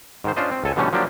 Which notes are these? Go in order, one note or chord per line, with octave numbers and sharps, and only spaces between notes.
G#2 D#3 C5
C#4 D4 F4 C5 D#5
C4
C#2 A4 G#5
B2 D3 E3 G3 A3 C#4
F3 F#3 A#3 D4 G4